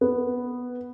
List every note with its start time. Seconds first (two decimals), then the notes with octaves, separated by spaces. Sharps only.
0.01 B3